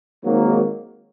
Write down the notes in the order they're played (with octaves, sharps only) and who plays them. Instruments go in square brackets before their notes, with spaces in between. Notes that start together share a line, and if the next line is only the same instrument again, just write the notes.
[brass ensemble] G#1 G#2 D#3 F#3 A#3